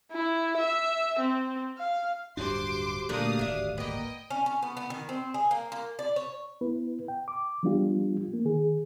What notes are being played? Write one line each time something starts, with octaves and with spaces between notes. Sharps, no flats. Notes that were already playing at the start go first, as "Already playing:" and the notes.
E4
E5
C4
F5
D1 G2 D4 F#4 G4 C5 C6 D6
A#2 D3 F3 A3 A#3 D4 F5 D#6
D1 G#1 A3 D4 E5
A#3 B3 D#5 G5
C#4
C#4
B3
B3
D#3
C4
G#4
A#3
A#3
D5
C#5
B3 E4 B4
G5
D6
F3 G3 B3 D4 F4 G4
A#3
D#3 G#4